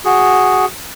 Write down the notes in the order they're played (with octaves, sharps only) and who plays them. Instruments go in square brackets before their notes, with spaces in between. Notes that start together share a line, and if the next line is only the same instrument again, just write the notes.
[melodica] F#4 G#4